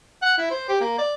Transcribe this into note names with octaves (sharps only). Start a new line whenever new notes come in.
F#5
E4
C5
G4
A#3
D5